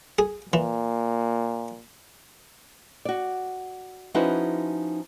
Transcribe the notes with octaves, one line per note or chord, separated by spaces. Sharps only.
G#4
A#2 E3
F#4 D5
F3 C#4 D#4 E4 F#4 B4